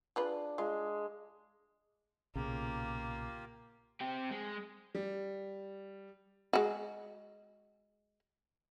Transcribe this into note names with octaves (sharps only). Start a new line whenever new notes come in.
G#3 D4 F4 B4
G#3 F4
B1 A#2 C#3 A#3 F4 G4
C4 G4
G#3
G3
G#3 F#4